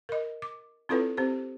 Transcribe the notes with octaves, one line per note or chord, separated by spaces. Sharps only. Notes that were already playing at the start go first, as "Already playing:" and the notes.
A#4 D#5
D6
C4 E4 F4 A4 B4 C#5
C4 G4 C5